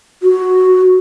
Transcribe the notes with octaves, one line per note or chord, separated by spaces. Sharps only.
F#4